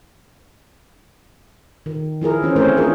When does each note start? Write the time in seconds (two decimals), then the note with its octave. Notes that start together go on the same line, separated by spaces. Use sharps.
1.86 D#3
2.21 F3 E4 G#4 A#4
2.42 E3 C#4 C5
2.56 A3 C4 C#4 A#4 C5 C#5
2.77 D4 F4 G#4 A#4